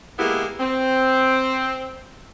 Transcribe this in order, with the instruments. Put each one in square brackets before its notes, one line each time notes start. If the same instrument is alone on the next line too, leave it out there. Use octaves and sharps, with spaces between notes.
[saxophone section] G#3 A#3 B3 E4 G4
C4